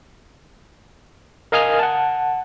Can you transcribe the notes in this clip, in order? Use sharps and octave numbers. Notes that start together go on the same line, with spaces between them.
A#4 D#5 F5 G#5 D#6 F6
F#5 A5